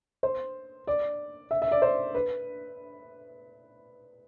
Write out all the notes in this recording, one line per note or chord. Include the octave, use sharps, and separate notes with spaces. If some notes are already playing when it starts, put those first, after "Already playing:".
C5
D5
E5
E5
D5
C5
B4